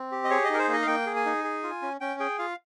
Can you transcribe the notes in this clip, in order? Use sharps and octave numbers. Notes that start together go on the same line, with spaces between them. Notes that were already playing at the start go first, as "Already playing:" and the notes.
Already playing: C4
G4
D#5
G#4 C#5
D#5
D#4 A#4
C5
A#3
D#5
F5
A#3 G5
G#4
G#5
D#4
G#4
F4
C#4
C#4 G5
G#4 G5
F4 F5